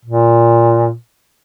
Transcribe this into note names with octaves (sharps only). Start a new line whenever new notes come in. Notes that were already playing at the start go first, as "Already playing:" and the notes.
A#2